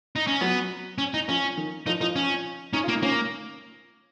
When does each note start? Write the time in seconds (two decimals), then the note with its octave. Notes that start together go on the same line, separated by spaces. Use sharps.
0.16 D#4
0.27 C#4
0.41 F#3 B3
0.98 C#4
1.14 D#4
1.28 F3 C#4
1.57 D#3
1.86 F3 D#4
2.00 F3 D#4
2.16 C#4
2.73 C#4 D#4
2.84 F4
2.88 A#3
2.93 D#4
3.03 A#3 C#4